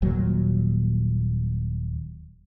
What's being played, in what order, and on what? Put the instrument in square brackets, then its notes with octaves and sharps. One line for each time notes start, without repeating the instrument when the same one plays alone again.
[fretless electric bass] D#1 A#2 F#3